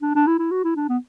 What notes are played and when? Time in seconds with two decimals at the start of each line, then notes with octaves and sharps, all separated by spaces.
0.02 D4
0.15 D4
0.27 E4
0.39 E4
0.51 F#4
0.64 E4
0.76 D4
0.89 B3